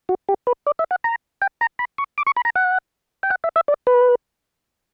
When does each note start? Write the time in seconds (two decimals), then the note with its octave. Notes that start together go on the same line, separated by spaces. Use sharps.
0.09 F#4
0.29 G4
0.47 B4
0.67 D5
0.79 E5
0.91 F#5
1.04 A#5
1.42 G5
1.61 A#5
1.79 B5
1.98 C#6
2.18 D6
2.27 C#6
2.37 B5
2.45 A#5
2.55 F#5
3.23 G5
3.30 F#5
3.44 E5
3.56 E5
3.68 D5
3.87 B4